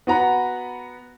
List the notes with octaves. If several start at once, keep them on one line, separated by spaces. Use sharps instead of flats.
B3 F#4 A#5 B5